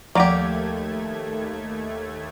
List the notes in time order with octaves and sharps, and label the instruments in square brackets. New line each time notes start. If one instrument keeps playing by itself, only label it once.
[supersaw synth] D#2 A3 G#6 [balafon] F3 D5 F#5 [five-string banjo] A#3 G4